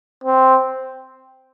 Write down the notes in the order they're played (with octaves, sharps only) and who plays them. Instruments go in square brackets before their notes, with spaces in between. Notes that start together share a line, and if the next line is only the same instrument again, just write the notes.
[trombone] C4